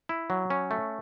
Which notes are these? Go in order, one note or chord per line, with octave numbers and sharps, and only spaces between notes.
E4
F#3
C#4
A3